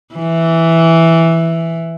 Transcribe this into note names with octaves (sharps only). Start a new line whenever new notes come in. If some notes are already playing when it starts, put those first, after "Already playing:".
E3